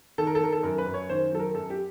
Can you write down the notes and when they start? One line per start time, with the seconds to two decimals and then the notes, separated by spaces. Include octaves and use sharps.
0.18 D#3 A4
0.27 A#4
0.35 A4
0.40 D#3 A#4
0.53 A4
0.63 F#2 A#4
0.78 B4
0.86 F#2
0.94 C#5
1.09 D#3 C5
1.32 F#3 A4
1.39 A#4
1.54 F#2 A4
1.70 G4